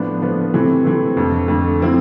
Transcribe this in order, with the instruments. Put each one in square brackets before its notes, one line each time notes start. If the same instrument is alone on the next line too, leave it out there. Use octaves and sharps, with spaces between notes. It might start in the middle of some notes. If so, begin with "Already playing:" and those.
Already playing: [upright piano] A2 F3 B3 D4
A2 F3 B3 D4
C3 E3 A3 C4
C3 E3 A3 C4
F2 D3 A3
F2 D3 A3
D3 F3 C4 E4